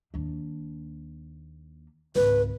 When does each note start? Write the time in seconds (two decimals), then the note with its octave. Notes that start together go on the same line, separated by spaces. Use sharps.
0.14 D#2 D4
2.16 G#1 C#2 B4